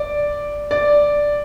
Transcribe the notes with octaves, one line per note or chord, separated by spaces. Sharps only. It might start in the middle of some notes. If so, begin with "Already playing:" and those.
Already playing: D5
D5